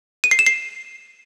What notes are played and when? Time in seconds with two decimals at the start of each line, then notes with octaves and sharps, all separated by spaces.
0.24 D#7
0.31 C7
0.39 E7
0.46 C7